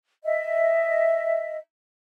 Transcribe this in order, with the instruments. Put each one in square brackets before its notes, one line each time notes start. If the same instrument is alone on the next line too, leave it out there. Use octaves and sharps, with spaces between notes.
[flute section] D#5 E5